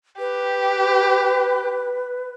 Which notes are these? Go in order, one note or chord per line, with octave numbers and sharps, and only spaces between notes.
G4 B4